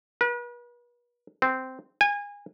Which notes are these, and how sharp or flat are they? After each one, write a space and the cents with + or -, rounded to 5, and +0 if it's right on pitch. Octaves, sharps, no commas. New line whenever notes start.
B4 -40
C4 -10
G#5 -25